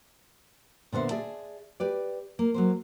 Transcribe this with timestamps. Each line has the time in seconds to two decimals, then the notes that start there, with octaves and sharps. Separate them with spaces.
0.92 A#2 D3 B3 C5 E5
1.11 G#4 D5 E5 A5
1.80 G4 B4 D5
2.39 A#3
2.54 F#3 A#3 C5